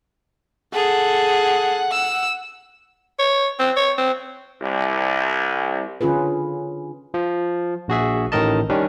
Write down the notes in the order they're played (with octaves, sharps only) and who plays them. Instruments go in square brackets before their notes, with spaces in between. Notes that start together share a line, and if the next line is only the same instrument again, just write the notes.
[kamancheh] G#4 A4 [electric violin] F#5
[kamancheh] E6
[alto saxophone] C#5
C4
C#5
C4
[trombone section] C2
[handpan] D3 C#4 F4 G#4 B4
[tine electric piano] F3
A#1 F#4 G#4 E5
A1 A2 D#3 A#4 D#5 A5
D#3 G3 C#4 D4